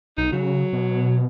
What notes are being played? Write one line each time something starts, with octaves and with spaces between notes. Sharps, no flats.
B1 D#4
C#3 F#3
B2